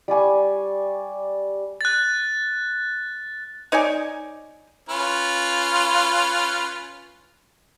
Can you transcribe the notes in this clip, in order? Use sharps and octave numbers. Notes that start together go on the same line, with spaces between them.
G3 D5 G#5 C#6
F#6 A6
D#4 C#5 D5 G#5
C#4 F4 B4